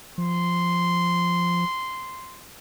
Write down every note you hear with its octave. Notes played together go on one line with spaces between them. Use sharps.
F3 C6